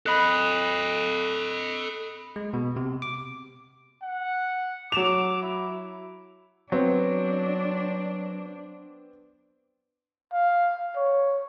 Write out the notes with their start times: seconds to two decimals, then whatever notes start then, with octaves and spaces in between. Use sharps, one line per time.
0.06 A4 D#5 B5 D#6 F#6
2.36 G#3
2.53 B2
2.76 C3
3.02 D6
4.03 F#5
4.92 F#3 D6 E7 F7
5.42 E4
6.72 F#3 B3 C4 D4
10.33 F5
10.96 C#5